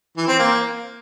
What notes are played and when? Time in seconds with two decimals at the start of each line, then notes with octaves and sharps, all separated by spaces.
0.17 E3
0.28 C4
0.39 A#3